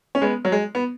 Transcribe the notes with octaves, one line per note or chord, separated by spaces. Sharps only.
C#4
G#3 B3
F#3
G#3
B3